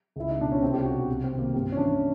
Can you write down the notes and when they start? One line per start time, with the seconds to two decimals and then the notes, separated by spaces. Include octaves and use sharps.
0.16 C#2 E4
0.31 D#4
0.39 B2 D4
0.52 C#4
0.62 C2 C4
0.74 G4
0.85 B2 F#4
1.08 C2
1.24 C4
1.31 C3 D#3
1.39 A#3
1.54 G2 C4
1.72 C#4
1.77 E3 D4